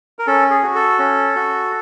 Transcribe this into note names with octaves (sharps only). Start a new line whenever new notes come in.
A#4
C#4 A4
G#4
F#4
A4
C#4
F#4